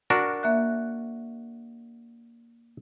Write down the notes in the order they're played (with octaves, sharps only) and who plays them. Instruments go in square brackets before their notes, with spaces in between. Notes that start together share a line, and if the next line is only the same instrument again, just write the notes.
[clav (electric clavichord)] D4 F#4 A#4
[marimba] A#3 E5 F#6